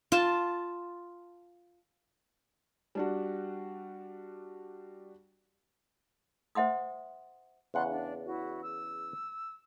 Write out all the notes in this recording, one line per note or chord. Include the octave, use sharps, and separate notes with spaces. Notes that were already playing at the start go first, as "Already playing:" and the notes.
F4 A5
G3 D4 F#4
C5 E5 F#5 C6 D#6
E2 C#3 D5 F#5 C6 F#6
D4
E4 F#4
E6